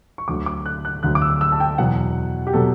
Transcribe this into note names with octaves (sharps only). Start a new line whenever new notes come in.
C#6
D2 D3 F#3 D6
D6
F#6
F#6
D2 D3 F#3 F#6
D6
E6
E6
A5
G5
E2 B2 F#3 F#5
G4
B2 F#3 A4